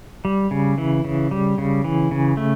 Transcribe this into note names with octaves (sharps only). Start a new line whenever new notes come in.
G3
C#3
E3
C#3
G3
C#3
E3
C#3
A3